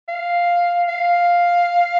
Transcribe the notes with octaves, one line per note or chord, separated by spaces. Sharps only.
F5
F5